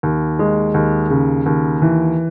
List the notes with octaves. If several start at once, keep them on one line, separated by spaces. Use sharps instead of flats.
D#2
G#3
D#2
C#3
D#2
E3